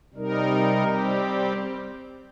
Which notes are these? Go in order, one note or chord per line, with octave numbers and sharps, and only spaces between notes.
C3 G3 D#4 A#4
G3 C4 G4